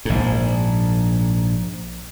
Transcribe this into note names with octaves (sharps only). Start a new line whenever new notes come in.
A#1 G#2